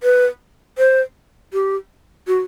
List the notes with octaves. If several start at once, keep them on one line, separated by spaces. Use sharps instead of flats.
B4
C5
G4
F#4